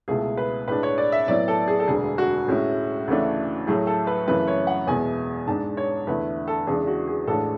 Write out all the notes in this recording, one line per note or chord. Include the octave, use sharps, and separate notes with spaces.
C#2 B2 A3 E4 G#4
B4
A2 G#3 D4 B4
C#5
D5
E5
A2 F#3 B3 E4 D5
A4
G#4
A4
E1 D2 D3 G#4
F#4
A2 G#3 C#4 E4
D2 C#3 E3 A3 D4
A2 F#3 A3 E4 G#4
A4
B4
F#2 C#3 E3 A3 E4 B4
C#5
F#5
E2 B2 G#3 B3 E4 G#5
G#2 G#3 D4 A5
C#5
E2 D3 A3 E4 B4
A4
E2 C#3 E3 G#3 D4 G#4
F#4
G#4
A1 A2 G#3 D4 A4